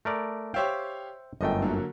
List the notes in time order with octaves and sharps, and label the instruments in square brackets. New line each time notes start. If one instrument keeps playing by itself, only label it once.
[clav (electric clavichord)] A3 A#4 D5
[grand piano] G4 C#5 F5 [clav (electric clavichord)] C5 E5 G5
[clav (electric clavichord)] G1 F#2 A3 [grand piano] D#5 G5
[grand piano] D3 F#3 A#3